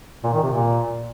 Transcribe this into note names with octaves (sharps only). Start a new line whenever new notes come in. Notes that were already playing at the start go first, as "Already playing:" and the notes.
A#2
D#3
C3
A#2